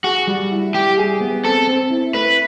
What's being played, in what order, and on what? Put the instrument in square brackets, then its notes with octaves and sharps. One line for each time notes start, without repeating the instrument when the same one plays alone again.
[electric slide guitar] F#4 [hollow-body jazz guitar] G#4
[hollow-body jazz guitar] G3
E4
[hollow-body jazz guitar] G3 [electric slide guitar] G4
[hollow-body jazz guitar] G#4
B3
[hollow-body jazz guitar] C4 [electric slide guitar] A4
[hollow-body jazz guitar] C4
E4
[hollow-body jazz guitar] A3 [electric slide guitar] B4